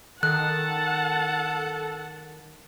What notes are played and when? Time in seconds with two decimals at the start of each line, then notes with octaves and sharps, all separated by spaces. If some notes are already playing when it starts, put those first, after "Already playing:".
0.23 D#3 A4 F#5 A5 F#6